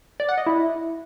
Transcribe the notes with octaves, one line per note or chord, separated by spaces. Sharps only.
D5
F#5
D#5
E4